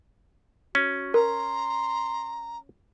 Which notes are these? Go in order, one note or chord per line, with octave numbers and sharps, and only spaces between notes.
C#4 F#4
A#4 A#5 C6